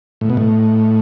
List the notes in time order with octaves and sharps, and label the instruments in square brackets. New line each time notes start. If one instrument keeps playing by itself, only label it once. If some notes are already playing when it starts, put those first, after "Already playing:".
[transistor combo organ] A2
B2
A2